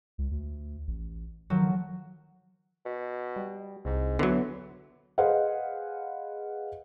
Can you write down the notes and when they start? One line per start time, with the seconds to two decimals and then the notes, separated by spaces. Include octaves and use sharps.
0.18 C#2
0.31 D2
0.87 A1
1.50 D#3 F3 F#3
2.85 B2
3.36 G3
3.85 C2 G#2
4.19 D3 E3 F#3 B3
5.18 G#4 B4 C5 D#5 F5 F#5